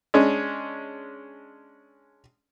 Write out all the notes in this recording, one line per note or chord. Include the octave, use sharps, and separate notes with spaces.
G#3 C#4 D4